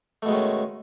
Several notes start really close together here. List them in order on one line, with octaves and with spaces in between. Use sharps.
A3 B2 G#3 D#3 C#4